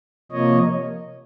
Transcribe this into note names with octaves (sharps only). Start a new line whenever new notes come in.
C3 F3 A#3 C#5 D#5